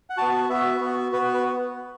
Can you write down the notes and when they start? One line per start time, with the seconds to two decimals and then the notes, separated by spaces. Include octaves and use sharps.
0.10 F#5
0.17 B3 F#4 A5
0.49 B3 F#4 E5
0.81 B3 F#4
1.12 B3 F#4 B4
1.34 B4